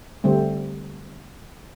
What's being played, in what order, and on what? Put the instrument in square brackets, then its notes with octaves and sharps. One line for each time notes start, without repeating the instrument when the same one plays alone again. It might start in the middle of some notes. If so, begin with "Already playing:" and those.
[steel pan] D3 G3 A3 C4